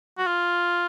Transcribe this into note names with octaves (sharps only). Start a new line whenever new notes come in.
F#4
F4